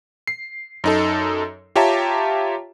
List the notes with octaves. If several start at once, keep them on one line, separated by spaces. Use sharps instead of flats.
C7
F#2 D#4 A4
F4 G4 C#5 E5 A5 A#5